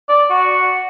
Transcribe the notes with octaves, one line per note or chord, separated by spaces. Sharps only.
D5
F#4